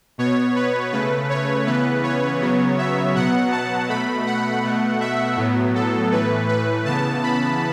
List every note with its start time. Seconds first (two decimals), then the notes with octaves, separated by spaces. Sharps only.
0.18 B2 B3 C#5
0.56 B4
0.92 C#3 A3 B4
1.30 C#5
1.66 C#3 E3 B3 B4
2.03 C#5
2.42 C#3 F#3 B3
2.78 E5
3.15 B2 F#3 B3 F#5
3.52 A5
3.89 B2 A3 B5
4.27 F#5
4.64 B2 A3
5.01 E5
5.37 A2 F#3 B3
5.75 A4
6.12 A2 E3 A3 B4
6.49 B4
6.85 C#3 E3 B3 A5
7.23 B5